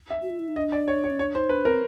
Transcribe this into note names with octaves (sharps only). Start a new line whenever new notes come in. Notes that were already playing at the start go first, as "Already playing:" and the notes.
E5
F#4
F4
E4
D#4
D4 D#5
D5
C#5
C#5
C#4
D4 C#5
D#4 C5
D4 B4
C4 A#4